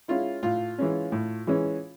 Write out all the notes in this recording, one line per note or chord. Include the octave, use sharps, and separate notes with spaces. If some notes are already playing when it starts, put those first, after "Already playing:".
G#3 C#4 E4 F4
A2 F4
E3 G#3 C#4
A2
E3 G#3 C#4